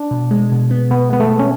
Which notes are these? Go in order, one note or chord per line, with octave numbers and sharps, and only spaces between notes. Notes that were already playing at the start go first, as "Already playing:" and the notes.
Already playing: D4
B2
G#3
B2
B3
B2 B3
G#3 B3
A3
B2
C#4